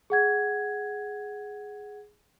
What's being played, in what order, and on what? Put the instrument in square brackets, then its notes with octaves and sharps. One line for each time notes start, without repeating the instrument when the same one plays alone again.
[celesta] G#4 F#5 G#6